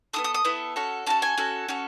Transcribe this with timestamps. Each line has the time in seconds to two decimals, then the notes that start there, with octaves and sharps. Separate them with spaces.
0.13 B3 E4 A4 D#6
0.24 D#6
0.34 D#6
0.44 B3 E4 A4
0.76 C#4 F#4 A4
1.06 C#4 F#4 A4 A5
1.22 G#5
1.37 C#4 F#4 A4
1.68 C#4 F#4 A4